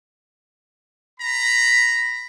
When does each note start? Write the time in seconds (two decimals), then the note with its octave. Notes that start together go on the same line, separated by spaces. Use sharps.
1.20 A#5 B5